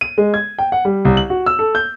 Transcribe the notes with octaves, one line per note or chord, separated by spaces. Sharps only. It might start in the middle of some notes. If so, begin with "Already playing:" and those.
D#7
G#3
G#6
G5
F#5
G3
C2
F#7
F#4
E6
A4
G6